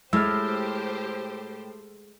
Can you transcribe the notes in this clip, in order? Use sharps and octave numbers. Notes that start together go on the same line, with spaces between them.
A2 G#3 G4 C5 E6 F6